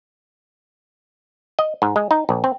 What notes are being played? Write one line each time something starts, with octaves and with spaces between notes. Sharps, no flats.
D#5
G#2
G#3
D#4
A#1
C4